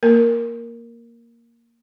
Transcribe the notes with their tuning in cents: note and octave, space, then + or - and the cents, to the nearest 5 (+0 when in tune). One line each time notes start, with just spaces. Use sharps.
A#3 +0 A#4 +0